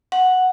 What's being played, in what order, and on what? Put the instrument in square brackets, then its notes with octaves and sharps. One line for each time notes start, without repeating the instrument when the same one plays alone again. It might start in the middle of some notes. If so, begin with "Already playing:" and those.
[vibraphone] F#5